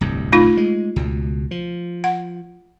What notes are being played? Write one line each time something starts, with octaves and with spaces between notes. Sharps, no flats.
D1 C2 G2
A3 D#4 F4
G#3
C#2 B2
F3
F#5